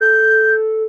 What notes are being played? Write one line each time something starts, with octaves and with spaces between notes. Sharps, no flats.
A4 G6